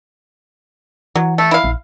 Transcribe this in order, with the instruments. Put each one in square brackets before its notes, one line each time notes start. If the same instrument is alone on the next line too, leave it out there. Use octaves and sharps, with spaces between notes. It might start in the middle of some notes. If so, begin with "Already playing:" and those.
[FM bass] E3 [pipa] F#3
[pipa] A3
E4 F5
[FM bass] A#1